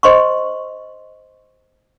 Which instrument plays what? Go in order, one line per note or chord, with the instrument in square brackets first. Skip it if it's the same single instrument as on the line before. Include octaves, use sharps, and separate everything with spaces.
[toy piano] C5 D#5 C6 C#6